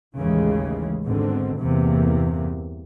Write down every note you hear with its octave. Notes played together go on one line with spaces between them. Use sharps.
A1 D#2 C#3 E3 G#3
G#1 G#2 B2 D3 C4
E2 G2 C3 E3 A#3